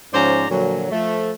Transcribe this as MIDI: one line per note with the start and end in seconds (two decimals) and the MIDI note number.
0.13 0.45 44
0.13 0.45 53
0.13 0.45 61
0.13 0.45 72
0.13 0.45 74
0.13 0.45 82
0.49 0.87 46
0.49 0.87 50
0.49 0.87 53
0.49 0.87 54
0.92 1.31 53
0.92 1.31 57